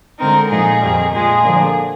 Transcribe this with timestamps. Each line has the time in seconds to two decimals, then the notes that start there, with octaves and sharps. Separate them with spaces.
0.19 D3 G#3 C4 D#4 A#4
0.50 A#2 F3 G#3 D#4 G#4
0.81 F2 D#3 G3
1.13 A#2 F3 G#3 G#4
1.44 D3 F3 A#3 D4